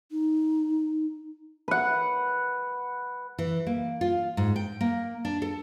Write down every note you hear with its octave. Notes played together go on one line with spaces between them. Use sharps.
D#4
B4 F#5
E3
A#3
F4
G#2
G5
A#3
D4
A4